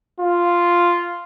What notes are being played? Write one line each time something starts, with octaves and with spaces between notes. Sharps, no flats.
F4